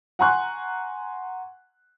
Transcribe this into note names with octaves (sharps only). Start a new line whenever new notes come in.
F#5 G#5 A#5 C6 C#6 F#6